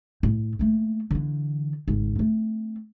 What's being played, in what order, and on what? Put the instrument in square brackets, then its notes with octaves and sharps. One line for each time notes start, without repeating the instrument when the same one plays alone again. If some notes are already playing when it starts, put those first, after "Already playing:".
[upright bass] A2
A3 A#3
D3 E3
G#1 C#2
A3 C4